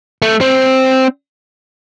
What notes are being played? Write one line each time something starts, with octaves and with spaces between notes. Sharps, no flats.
A3
C4